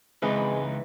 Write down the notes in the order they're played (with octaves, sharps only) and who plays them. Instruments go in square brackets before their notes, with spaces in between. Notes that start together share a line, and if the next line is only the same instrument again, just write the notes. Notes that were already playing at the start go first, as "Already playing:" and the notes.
[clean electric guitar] C#2 D#4 B4 [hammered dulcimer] E3 [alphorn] G#3 [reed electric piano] C4 D#5